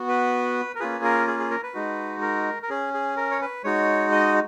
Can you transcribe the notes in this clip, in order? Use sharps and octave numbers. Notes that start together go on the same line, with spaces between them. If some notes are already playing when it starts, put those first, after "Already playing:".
Already playing: B3 F#4
B4
A#4
A#3 C#4 F4 G#4 B4
A#4
G#4
G#4
A#4
B4
G#3 D#4 F#4
A#4
A#4
C#4 G#4
G#4
A#4
C#5
B4
G#3 D#4 F#4 C#5
D#5